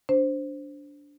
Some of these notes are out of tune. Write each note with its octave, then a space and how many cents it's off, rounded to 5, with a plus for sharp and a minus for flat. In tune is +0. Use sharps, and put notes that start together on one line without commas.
D4 -15 C5 +0